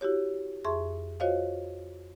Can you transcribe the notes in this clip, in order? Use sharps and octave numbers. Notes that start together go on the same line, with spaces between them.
E4 F#4 G4 C#5
F2 G#4 E5 C6 C#6
F4 F#4 C5 C#5 D#5 F5